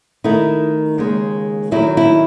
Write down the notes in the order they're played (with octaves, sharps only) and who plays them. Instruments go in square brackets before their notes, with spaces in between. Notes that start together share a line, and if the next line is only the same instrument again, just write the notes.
[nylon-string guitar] D#3 A3 D#4 E4
D#2 C#3 G#3
D#3 F#3 A3 D#4 E4
E4